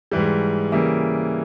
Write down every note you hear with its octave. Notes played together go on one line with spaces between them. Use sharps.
G#2 E3 G3
C#3 E3 G3 A#3